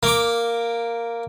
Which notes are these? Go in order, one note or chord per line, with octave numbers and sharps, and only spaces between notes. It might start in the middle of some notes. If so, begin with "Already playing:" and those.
A#3 D6